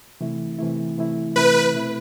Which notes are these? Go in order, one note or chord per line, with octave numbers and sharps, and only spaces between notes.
C3 E3 A3 E4
C3 E3 A3 E4
C3 E3 A3 E4
C3 E3 A3 E4 B4
B2 A3 C4 E4